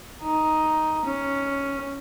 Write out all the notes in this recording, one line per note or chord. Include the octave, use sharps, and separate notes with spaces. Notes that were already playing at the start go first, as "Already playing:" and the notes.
D#4
C#4